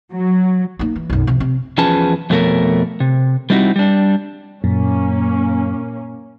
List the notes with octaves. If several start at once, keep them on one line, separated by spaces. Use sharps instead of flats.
F#3
A#3 D#4
E3
B1 F#2
C3 F3
C3
E2 F3 C#4 G#4 B4 A5
F2 B2 A3 B3 A#4 C#5
C3
G3 C4 D#4 E4 F#4
G3 D4
F#2 A#2 A#3 C#4